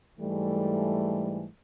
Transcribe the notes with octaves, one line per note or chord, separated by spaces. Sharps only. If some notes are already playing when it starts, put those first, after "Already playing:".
G#2 E3 G3 A3